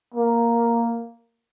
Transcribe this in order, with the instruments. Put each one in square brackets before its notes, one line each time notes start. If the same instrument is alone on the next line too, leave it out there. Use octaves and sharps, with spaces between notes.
[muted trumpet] A#3